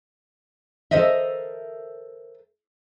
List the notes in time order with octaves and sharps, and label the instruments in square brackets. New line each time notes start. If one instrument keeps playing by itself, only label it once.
[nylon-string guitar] A4 A#4 C5 D#5 E5